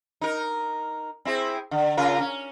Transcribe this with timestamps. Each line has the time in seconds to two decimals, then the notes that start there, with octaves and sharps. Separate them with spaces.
0.21 D#4 A#4
1.25 C4 E4 G#4
1.71 D3
1.97 C#3 F4 A#4
2.20 C#4